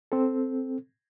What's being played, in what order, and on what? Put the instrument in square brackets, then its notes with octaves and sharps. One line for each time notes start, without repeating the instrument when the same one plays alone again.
[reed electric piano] C4 A4